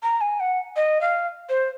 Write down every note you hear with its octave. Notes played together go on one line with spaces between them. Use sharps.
A#5
G#5
F#5
D#5
F5
C5